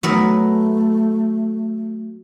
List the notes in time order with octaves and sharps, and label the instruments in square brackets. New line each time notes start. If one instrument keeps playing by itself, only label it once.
[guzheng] F#3 B3 A#4 [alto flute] A3